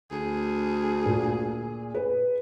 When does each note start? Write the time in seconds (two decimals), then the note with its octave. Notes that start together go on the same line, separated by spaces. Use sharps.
0.11 D2 G#4
1.06 A#2
1.94 B4